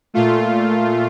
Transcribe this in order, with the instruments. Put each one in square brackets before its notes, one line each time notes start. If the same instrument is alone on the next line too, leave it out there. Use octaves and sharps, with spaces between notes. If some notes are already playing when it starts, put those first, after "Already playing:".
[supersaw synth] A#2 A3 F4